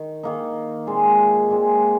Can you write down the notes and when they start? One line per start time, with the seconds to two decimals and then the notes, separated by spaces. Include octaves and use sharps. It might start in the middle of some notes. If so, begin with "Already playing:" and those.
Already playing: D#3
0.23 D#3 A#3 D#4
0.87 A#2 G#3 C4
1.50 A#2 G#3 C4